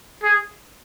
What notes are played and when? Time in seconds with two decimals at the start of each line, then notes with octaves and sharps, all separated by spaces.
0.23 G#4